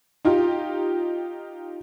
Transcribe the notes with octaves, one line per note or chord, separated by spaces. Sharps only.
D#4 F4 G4